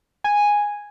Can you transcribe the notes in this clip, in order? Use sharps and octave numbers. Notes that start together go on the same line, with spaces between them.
G#5